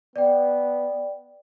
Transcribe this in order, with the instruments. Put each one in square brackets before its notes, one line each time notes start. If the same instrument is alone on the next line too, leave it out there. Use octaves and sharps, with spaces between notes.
[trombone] B3 [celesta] D5 G5